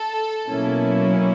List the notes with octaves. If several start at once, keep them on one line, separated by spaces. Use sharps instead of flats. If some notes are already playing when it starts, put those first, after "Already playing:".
Already playing: A4
B2 F#3 A#3 C#4 E4